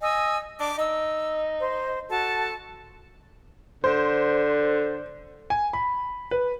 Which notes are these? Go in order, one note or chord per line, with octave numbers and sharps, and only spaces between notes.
D#5 G#5 E6
D4 D6
D#4 E6
C5
F#4 A4 A5
D3 C5
G#5
B5
B4